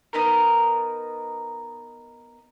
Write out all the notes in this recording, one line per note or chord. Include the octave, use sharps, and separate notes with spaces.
B3 D#4 A#4